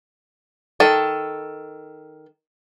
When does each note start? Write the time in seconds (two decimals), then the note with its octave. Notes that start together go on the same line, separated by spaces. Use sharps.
0.80 D#3 A4